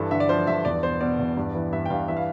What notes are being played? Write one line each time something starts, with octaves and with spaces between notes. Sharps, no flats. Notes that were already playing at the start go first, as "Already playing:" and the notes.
Already playing: G2 E3 A4
D3 E5
D5
F3 C5
G2 E5
E2 D5
B2 C5
B2 D5
E2
G2
E3
G2 E5
G5
G2 F5
E3 E5
F5